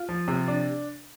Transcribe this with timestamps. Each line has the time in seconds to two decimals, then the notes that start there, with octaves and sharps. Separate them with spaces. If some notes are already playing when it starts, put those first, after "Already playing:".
Already playing: F4
0.09 F3
0.28 C3
0.48 D4